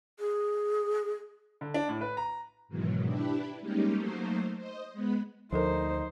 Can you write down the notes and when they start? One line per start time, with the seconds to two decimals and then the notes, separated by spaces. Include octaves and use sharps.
0.20 G#4
1.61 D3
1.74 D4
1.89 A2
2.01 B4
2.17 A#5
2.68 G#2 B2 D#3 E3 F#3
3.05 D4 E4 G4 B4
3.60 G3 G#3 A#3 C#4 D#4 G4
3.95 F#3 A3 A#3 D#4 C5
4.58 C5 D#5
4.93 G#3 B3 B4
5.52 D2 F3 D#4 A4 A#4 C5